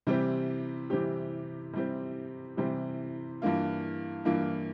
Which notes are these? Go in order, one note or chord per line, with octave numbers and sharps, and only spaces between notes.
C3 E3 G3 C4 G4
C3 E3 G3 C4 G4
C3 E3 G3 C4 G4
C3 E3 G3 C4 G4
G2 E3 A#3 F4
G2 E3 A#3 F4